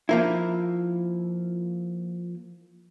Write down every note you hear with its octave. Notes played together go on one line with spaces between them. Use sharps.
F3 A#3 E4